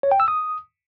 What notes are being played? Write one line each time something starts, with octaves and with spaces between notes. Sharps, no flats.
C#5
G5
E6
D#6